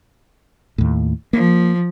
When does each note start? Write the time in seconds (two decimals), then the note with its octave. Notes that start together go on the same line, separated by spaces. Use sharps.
0.78 D#2 A2
1.33 F3 A#3